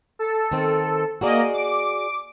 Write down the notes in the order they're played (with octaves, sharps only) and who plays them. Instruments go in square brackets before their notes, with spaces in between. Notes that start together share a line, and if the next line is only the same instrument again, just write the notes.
[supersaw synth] A4
[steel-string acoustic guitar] D#3 C4
[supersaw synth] A#3 D#5 [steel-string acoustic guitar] F#4 G#4 D5
[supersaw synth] D6